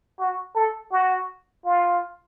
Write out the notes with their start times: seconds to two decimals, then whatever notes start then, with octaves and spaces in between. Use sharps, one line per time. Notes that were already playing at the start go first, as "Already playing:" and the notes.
0.19 F#4
0.56 A4
0.92 F#4
1.65 F4